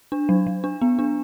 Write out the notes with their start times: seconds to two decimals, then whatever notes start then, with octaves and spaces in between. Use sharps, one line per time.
0.12 D4
0.29 F#3
0.47 F#3
0.64 D4
0.81 B3
0.99 D4